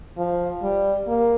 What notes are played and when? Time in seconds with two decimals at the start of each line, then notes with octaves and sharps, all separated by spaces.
0.18 F3
0.62 G3
1.08 A#3